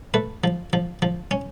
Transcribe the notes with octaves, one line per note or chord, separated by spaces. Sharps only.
A3 B4
F3
F3
F3
C#4